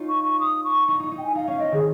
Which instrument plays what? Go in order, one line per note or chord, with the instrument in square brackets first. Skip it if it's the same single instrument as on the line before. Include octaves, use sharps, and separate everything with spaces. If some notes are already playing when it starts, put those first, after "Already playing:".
Already playing: [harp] C#4 D#4 F4
[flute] C#6
C#6
D#6
C#6
[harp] D#4 [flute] C#6
[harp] D#4
D#4
[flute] G5
G#5
[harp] D#4 [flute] F5
[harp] C#4 [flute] F5
[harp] C4 [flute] D#5
[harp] D#3 [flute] G#4